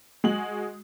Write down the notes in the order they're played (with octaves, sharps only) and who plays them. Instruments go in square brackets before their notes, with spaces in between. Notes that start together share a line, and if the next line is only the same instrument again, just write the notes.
[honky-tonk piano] G#3 F#4 F#7